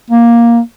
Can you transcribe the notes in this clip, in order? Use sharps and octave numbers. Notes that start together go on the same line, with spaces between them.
A#3